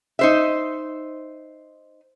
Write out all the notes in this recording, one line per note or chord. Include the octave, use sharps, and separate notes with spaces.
D#4 C5 E5